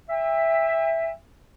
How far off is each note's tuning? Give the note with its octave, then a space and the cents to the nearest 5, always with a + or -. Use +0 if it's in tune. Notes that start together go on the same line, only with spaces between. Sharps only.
E5 +0 G5 +40